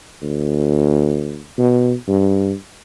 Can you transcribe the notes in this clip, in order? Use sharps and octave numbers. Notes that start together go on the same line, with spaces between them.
D2
B2
G2